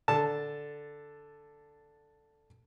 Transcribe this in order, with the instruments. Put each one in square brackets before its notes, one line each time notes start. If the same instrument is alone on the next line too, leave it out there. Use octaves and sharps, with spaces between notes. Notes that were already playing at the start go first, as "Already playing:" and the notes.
[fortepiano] D3 A5